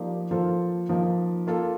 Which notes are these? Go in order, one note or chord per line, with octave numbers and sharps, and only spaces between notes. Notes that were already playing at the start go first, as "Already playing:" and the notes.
Already playing: F3 A#3 D#4 G4 D5
F3 A#3 F4 A4 C5
F3 A#3 D#4
A#3 F4 A4